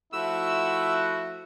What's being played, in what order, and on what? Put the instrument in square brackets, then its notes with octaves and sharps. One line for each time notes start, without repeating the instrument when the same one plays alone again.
[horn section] F3 A3 F#4 [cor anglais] E4 [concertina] E6